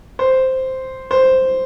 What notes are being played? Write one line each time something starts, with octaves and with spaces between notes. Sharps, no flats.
C5
C5